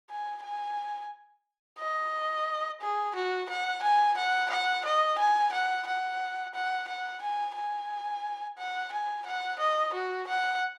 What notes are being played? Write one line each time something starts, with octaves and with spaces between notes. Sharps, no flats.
G#5
G#5
D#5
G#4
F#4
F#5
G#5
F#5
F#5
D#5
G#5
F#5
F#5
F#5
F#5
G#5
G#5
F#5
G#5
F#5
D#5
F#4
F#5